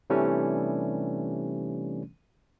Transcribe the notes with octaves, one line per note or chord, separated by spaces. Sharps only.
C3 E3 G3 A3 C#4 D4